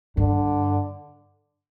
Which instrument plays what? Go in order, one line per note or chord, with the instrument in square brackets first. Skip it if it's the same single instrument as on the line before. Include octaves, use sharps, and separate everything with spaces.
[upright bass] G2 [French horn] D3